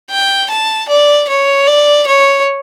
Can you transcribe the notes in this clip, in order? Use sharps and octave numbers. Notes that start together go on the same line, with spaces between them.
G5
A5
D5
C#5
D5
C#5